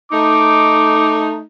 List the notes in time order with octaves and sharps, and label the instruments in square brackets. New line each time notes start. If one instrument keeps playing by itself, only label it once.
[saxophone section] A3 D#4 [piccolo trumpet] D6